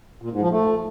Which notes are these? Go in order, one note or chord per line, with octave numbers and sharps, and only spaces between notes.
A#2
G#2
F3
A3